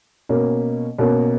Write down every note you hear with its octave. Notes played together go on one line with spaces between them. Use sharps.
B2 A#3 C#4
B2 A#3 C#4